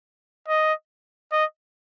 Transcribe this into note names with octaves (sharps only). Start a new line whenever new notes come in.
D#5
D#5